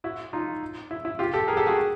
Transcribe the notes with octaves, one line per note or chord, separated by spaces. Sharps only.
E4 F#4
D#4 F4
E4
E4
F4 G4
G4 A4
G#4 A#4
G4 A4
F#4 G#4